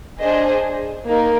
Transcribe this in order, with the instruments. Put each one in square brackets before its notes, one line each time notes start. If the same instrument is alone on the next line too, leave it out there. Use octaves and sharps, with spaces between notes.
[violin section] D4 G#4 C5 D#5
A#3 D#4 A#4